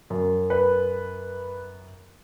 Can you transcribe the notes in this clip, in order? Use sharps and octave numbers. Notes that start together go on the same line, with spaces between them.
F#2
B4